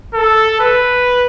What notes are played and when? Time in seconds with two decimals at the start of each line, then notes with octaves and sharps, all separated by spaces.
0.14 A4
0.60 B4